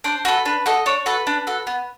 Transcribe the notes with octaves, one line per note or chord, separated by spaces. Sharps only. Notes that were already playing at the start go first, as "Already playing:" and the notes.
D4 C5
F#4 A4 B4
D4 B4
F#4 A4 D#5
D4 C#5
F#4 A4 B4
D4
F#4 A4
B3